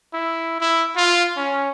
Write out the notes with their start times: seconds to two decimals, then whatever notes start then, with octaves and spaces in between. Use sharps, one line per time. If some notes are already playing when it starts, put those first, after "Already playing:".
0.13 E4
0.61 E4
0.96 F4
1.37 C#4